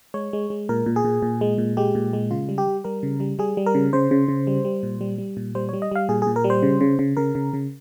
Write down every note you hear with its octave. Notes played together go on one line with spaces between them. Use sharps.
G#3 C#5
G#3
G#3
A#2 A#4
A#2
G#4
A#2
A#2
G#3
A#2
G#3 G4
A#2
G#3
C#3 F4
G3
G4
G3
G3 A#4
C#3
G3
G3 G#4
G3
A#4
C#3
C#3 C5
C#3
C#3
G3
G3
A#2
G3
G3
A#2
G3 C5
C#5
G3
D#5
G3 F5
A#2 G#4
G#4
A#2
A#4
G3
C5
C#3
C#3
C#3
C#3 A#4
C#3
C#3